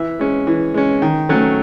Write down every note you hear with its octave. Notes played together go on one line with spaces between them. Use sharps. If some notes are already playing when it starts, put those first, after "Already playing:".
Already playing: E3 E5
G#3 C#4
E3
G#3 C#4
D#3
F#3 A3 C#4